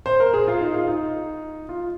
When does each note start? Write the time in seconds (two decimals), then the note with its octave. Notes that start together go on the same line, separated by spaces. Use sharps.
0.06 C5
0.20 A#4
0.34 G#4
0.48 F4
0.61 D#4
0.74 F4
0.88 D#4
1.69 F4